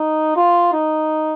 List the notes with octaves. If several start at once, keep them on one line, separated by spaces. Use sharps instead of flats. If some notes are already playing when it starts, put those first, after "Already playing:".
Already playing: D#4
F4
D#4